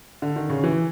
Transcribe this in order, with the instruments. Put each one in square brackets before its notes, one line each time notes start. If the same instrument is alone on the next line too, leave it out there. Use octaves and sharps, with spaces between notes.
[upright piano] D3
D#3
C#3
E3